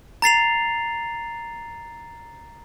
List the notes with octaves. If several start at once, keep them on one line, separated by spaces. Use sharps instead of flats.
A#5 A6 C7 F7